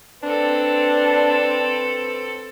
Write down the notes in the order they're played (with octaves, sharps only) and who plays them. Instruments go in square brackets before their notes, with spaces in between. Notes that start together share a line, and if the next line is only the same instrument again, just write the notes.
[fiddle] C4 A4 [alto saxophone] D4 [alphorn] B4